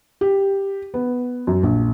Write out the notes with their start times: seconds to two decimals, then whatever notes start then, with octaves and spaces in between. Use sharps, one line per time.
0.21 G4
0.94 B3
1.47 F#2
1.63 A#1